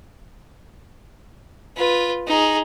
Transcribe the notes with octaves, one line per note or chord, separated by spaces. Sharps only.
F4 B4
D#4 G#4